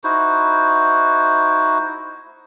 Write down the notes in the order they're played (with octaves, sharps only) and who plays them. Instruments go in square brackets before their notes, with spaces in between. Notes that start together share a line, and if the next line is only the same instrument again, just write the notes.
[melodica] D#4 E4 F#4 C5